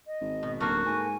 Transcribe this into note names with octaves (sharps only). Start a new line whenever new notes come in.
D#5
G#1
B2
D1 A3 A#3 F#4 F6
G#2 G#5